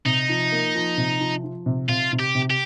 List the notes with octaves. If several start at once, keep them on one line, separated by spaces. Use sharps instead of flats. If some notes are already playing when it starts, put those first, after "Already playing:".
C3 D#4
F3
A#3
F3
C3
F3
F3
C3
C3 F4
C3
G4
C3
G4